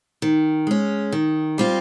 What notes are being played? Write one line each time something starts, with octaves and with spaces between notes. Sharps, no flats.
D#3
G#3 C#4
D#3
G3 C4 F4